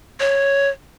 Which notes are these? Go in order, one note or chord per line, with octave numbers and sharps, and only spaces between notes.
C#5